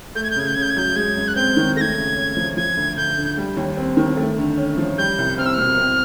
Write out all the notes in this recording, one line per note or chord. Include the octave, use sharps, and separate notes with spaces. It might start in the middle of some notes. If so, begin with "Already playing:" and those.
A3 G6
G#6
G6
C#3 G#6
G6
C#3 G#6
G6
G#6
F#3 G6
G#3 G#6
F#2
F#6
C4 G6
D#3
A3 A#6
G#6
C#3
C#4
F3
F3 G#6
D2
D2 G6
D3
G3
D#2
C4
D#3
A3
D3
C#4
F3
G3 G6
C2
C4 F6
E6
B2 F6
C4